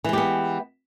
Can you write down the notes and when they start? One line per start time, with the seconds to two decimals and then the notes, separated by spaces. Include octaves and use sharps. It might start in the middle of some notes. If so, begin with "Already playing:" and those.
0.04 E3
0.09 G#3
0.13 G4
0.18 B3